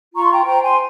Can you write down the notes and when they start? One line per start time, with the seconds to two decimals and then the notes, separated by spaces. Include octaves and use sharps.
0.16 F4 A#5 C#6
0.24 C6
0.31 G5 A#5
0.46 C5 G5 A#5
0.62 G#5 C6